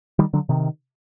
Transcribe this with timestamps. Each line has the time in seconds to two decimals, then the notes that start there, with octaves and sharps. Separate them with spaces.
0.19 D#3 G3
0.33 D3 F#3
0.49 C3 D#3